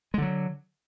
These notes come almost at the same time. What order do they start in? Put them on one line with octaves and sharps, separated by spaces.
G#3 D3 F#3